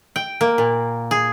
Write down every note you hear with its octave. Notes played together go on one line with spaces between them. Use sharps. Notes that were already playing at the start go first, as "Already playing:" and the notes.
G5
A#3
A#2
G#4